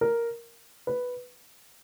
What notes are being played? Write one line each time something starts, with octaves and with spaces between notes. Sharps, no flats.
A#4
B4